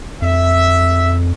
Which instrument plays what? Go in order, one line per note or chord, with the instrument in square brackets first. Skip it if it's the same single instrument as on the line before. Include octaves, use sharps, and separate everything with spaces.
[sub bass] F2 [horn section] E5